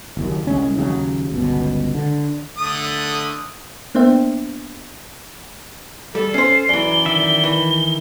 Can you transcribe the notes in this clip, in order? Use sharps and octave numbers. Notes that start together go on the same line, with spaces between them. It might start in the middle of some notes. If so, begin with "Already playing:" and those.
F#1 D#2
C2 G#3 C#4
D#2 C#3 F#3
G1 C#2 B2
D3
D3 A3 D#6
A#3 B3 D4 C5 E5 G5
G3 A4
C#4 C5 C7
F#2 E3 D5 G7
D#3 E5
E3